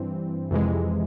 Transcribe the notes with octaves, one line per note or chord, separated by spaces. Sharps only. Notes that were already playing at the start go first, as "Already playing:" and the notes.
Already playing: G2 E3 C4
F2 C3 E3 G#3